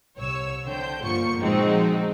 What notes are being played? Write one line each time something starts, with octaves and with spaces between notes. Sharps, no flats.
C2 C#5 E6
D3 C5 G5 G6
G1 D3 F3 A#3 C#6 C#7
A#2 F3 G#3 C4 D#4 F#4